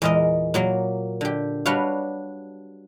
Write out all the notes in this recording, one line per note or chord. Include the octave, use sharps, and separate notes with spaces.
E2 A#2 G#3 A#4 D#5
A#2 F#3 A#3
D3 G4
G3 D4 F#4 B4 C#5 F5